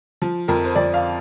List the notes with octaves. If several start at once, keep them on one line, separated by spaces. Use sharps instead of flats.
F3
F2 A#4
C5
F2 D5
F5